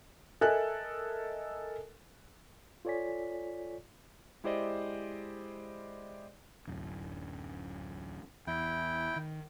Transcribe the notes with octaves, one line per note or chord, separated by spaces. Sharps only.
A4 A#4 D#5 E5 G#5 F#6
F4 A4 C#5 D5 G#5 B6
G#3 E4 G4 C5 D5 D#5
D1 F#2
E2 E4 G5
D#3